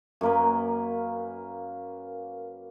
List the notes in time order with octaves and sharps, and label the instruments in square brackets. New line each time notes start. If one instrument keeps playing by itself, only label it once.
[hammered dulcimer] F#2 A#3 B4